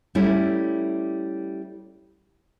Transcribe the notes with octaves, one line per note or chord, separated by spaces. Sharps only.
G3 A3 C#4 E4